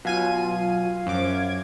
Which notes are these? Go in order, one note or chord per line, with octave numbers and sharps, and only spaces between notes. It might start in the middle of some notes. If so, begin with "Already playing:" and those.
B2 F#3 F4 F5 G#5 D#7
F#2 F3 D6
G#6